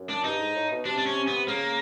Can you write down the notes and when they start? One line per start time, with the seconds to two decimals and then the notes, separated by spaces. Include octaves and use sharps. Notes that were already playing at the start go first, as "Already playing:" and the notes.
Already playing: F#2
0.09 D4
0.24 G2 D#4
0.39 G#2
0.55 A2
0.71 B2
0.85 C3 D4
0.98 D4
1.06 C#4
1.27 B3
1.48 C#3 A#3